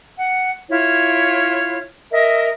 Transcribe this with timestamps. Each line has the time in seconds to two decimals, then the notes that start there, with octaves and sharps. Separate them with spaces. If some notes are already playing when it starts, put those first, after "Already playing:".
0.17 F#5
0.70 E4 F4 C#5
2.11 A#4 D#5 E5